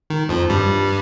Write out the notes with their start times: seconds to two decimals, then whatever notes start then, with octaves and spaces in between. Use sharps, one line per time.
0.10 D#3
0.29 F2 F3
0.50 G2 G3